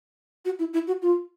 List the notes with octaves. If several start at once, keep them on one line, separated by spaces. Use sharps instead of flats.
F#4
E4
E4
F#4
F4